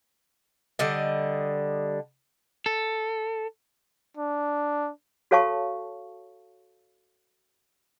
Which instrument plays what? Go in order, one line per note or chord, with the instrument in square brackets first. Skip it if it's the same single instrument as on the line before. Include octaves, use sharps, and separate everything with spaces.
[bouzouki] D3 G3 D#5
[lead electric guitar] A4
[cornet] D4
[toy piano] F#4 A4 C#5 F5 A5 C#6